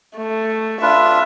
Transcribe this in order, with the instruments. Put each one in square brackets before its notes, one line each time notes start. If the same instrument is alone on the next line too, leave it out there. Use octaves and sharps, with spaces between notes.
[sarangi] A3
[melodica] D4 F4 B4 [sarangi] E5